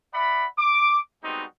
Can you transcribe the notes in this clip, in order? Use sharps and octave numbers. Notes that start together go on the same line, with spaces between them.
D5 E5 F#5 B5
D6
G3 G#3 B3 C4 D#4 F#4